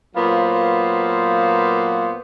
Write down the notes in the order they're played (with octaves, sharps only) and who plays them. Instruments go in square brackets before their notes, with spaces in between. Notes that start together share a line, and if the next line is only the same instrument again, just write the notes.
[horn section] A#2 F#3 B3 C5 F5